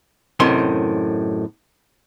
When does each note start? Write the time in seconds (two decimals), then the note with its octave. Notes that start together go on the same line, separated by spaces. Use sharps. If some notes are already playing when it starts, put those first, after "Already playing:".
0.40 F#2 A2 C3 D#3 C6